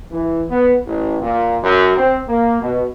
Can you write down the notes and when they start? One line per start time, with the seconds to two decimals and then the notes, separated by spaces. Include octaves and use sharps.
0.11 E3
0.49 B3
0.86 A1
1.21 A#2
1.62 F#2
1.97 C4
2.27 A#3
2.61 B2